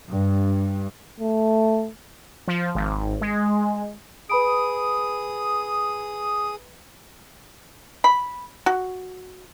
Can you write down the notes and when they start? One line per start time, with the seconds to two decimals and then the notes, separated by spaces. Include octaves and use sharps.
0.10 G2
1.20 A3
2.48 F3
2.75 G#1
3.21 G#3
4.30 G#4 B4 B5 D#6 D7
8.04 B5
8.66 F#4